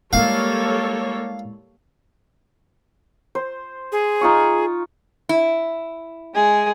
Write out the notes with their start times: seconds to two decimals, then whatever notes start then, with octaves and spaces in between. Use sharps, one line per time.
0.13 G3 G#3 A#3 E4 A4 C#5 F5
3.35 C5
3.92 G#4
4.21 D#4 F4 C#6
5.29 E4
6.34 G#3 G#4